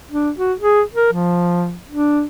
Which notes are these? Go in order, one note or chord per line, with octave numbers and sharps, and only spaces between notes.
D4
F#4
G#4
A#4
F3
D4